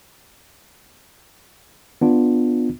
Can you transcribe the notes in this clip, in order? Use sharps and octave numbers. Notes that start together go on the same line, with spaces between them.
B3 D4 F4